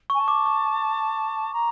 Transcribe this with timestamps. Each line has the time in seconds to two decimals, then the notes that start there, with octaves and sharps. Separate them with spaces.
0.10 G#5 C#6
0.19 A5
0.28 D6
0.46 C#6
1.53 A#5